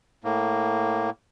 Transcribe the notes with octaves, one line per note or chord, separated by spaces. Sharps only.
A2 A#3